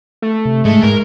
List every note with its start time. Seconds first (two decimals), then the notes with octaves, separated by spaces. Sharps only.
0.22 A3
0.45 C3
0.65 G#2 G#3 A3
0.83 G#2 A#4